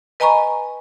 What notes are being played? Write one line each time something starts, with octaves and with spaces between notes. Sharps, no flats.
B4 D#5 G#5 A#5 B5 C#6